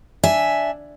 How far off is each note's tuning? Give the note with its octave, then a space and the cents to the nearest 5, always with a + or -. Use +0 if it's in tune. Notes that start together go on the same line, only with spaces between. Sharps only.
D4 +0 E5 +0 G#5 +0